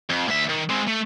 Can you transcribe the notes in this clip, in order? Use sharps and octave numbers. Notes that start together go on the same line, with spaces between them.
F2
D2 E5
D#3
G#3 C4
A3